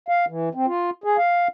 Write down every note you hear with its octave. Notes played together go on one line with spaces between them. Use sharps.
F5
E3
C4
F4
G#4
F5